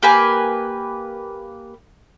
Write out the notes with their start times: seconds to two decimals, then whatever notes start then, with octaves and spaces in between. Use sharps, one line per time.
0.02 A#3 G4 B4 G#5